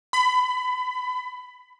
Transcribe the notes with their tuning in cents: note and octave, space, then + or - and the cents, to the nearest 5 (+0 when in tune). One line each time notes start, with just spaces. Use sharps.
B5 +25